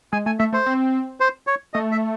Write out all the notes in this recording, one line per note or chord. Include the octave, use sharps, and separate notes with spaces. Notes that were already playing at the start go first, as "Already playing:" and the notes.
G#3 G#5
A3 G#5
A3 E5
A3 C5
C4
C5
C#5
A3 D#5
E5